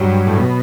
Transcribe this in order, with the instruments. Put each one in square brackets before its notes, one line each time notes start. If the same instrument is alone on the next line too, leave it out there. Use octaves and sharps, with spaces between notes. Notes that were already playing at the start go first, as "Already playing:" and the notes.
Already playing: [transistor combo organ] G2 [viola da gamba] F#3
[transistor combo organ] A2
B2